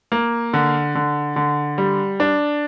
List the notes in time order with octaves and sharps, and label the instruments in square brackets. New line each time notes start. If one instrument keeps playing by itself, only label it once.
[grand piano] A#3
D3
D3
D3
G3
D4